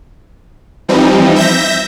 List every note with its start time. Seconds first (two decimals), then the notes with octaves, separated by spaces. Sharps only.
0.88 E3 F3 G3 C4 D#4
1.36 E5 G6 A#6